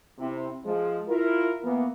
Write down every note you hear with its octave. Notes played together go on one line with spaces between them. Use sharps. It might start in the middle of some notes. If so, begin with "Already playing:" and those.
C3 C4 E4
F3 G#3
E4 F4 A#4
E3 A#3 B3